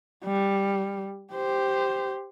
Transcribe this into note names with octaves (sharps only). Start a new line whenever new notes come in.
G3
G4 C5